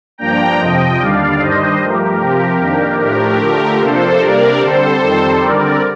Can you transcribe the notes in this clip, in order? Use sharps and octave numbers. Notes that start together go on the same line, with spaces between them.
G2 F3 A#3 D4 G5 A#5
F2 C3 F3 D#5 G5
D#2 D3 G3 D4 D5 F5
G2 D#3 G3 D4 C5 D#5
G2 F3 A3 G4 A#4
C3 F3 C4
F2 D#3 A#3 D4
A2 F3 A3 D4 G4 A#4
D3 F3 A3
C3 F3 A#3 D4 A4 C5
C3 G3 A#3 D4 A#4 D5
D3 G3 C4 A4 C5
F2 D#3 G3 C4
D3 G3 C4 A#4 D5